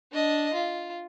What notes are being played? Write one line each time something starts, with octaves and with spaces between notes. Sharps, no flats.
D4 D#5
F4